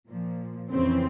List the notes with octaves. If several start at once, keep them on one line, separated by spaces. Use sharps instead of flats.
A#2 F3
F2 C#3 E3 C4